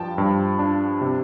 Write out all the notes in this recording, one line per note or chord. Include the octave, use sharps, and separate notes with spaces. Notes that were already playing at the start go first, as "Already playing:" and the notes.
Already playing: G2 F3 G5 A5
G2
D4
C3